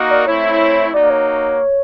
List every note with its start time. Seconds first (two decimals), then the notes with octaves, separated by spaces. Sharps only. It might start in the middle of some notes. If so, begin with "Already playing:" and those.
Already playing: A#3 D#4 F#4 A#4 D#5
0.10 D5
0.27 A3 C4 E4 C#5
0.93 A#3 D#4 F#4 D5
1.10 C#5